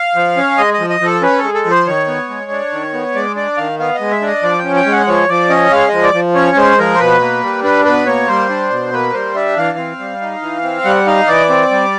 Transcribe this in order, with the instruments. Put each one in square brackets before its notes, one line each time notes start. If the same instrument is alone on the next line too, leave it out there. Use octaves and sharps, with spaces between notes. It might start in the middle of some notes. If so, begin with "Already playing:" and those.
Already playing: [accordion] F5
F3
C#4
G#3 D#5
D#5
F3
D#5
F3
A4
C#4 B4
A4
G#3
A4
F3
C5
D#3 C#5
B3
G#3
D4
D#3
B3
G#3 D5
D4 D5
D#3 F5
B3 F5
D#5
G#3
E5
D4
D#5
F3 D5
C#4 G5
G5
G#3
F#5
F3 C#5
F3 D5
C#4 D#5
G#3 F5
F3 D#5
D5
F3
C#4 C#5
G#3 C5
F3 A#4
C5
B2 B4
A#3
G3
D4 B4
B2 B4
A#3 C#5
G3 C5
D4
B2
A#3 B4
G3 C5
D4 E5
E3 F5
C4
G3
D#4
E3
C4
G3 F#5
D#4 F5
E3 D5
C4
G3